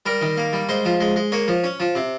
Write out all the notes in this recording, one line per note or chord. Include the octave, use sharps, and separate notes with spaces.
G3 A#4
D#3
A#3
G3
G#3 C5
F3
G#3
G#3
A#3 C#5
F3
C#4
F3
C3